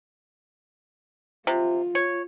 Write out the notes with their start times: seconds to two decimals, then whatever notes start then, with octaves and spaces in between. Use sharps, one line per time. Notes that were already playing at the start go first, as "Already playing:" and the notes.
1.47 C3 F4
1.95 C#5